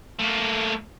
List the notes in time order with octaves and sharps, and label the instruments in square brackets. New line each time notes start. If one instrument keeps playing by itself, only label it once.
[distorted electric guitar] A3 A#3